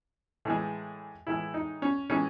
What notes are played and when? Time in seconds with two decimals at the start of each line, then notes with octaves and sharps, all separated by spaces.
0.45 A2 E3 G#3
1.27 A2 E3 G#3 E4
1.54 D#4
1.82 C#4
2.10 A2 E3 G#3 C#4